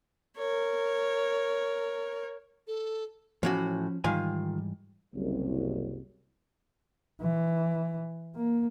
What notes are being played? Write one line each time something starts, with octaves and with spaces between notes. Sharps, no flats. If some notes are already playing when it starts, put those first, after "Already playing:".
A#4 C#5
A4
A2 E3 F3 C#4 F#4
G#2 D#3 E3 G3 F4 G#5
F#1 C2
E3
A#3